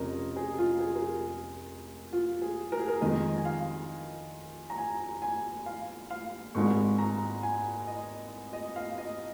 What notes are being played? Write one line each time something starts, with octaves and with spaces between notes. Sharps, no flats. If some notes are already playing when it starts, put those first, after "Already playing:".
Already playing: F1 F2 C#3 A#4 D#5
G#4
F4
G#4
A#4
G#4
F4
G#4
A#4
G#4
A#4
F2 D#3 G#3 D#5
G#5
F5
A#5
G#5
G#5
F5
F5
G#1 G#2 G#3 C#6
A#5
G#5
D#5
D#5
F5
D#5